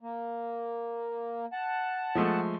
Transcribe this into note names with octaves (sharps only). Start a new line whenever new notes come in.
A#3
F#5 A5
F3 G#3 A3